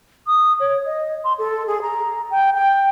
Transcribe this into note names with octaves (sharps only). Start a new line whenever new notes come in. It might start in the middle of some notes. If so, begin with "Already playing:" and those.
D#6
C#5
D#5
C6
A4
G#4
A#5
G5
G5